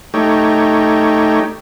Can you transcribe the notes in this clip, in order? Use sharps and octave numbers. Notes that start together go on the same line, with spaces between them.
A3 D#4 G4 C#5